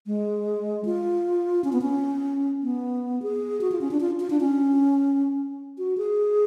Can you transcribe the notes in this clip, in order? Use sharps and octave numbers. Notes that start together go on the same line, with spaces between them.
G#3
F4
C#4
B3
C#4
B3
G#4
F#4
F4
C#4
D4
F4
F4
D4
C#4
F#4
G#4